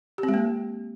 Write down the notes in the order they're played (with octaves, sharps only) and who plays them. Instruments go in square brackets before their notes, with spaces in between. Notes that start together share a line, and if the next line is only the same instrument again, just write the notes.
[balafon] G4
C4
G#3
A#3